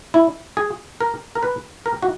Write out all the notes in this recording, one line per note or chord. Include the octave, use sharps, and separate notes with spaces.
E4
G#4
A#4
A#4
B4
A#4
F#4